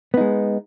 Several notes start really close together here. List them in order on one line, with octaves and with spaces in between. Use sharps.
B3 D#4 G#3